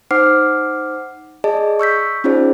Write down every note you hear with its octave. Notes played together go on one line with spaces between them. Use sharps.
D#4 C5 F#5 D6 F6 C7
G#4 D5 D#5 A5
C#6 E6 G6 B6
C#4 D#4 F4 G#4 C5 D5